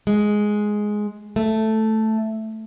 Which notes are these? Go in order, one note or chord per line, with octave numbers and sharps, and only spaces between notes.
G#3
A3